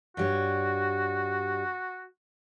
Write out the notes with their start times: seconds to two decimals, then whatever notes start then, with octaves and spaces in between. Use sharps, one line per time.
0.17 G2 G3 F#4 C#5